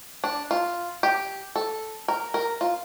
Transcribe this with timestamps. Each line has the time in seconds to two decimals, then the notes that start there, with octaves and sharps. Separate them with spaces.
0.24 D4
0.51 F4
1.03 G4
1.56 A4
2.08 A#4
2.34 A#4
2.61 F4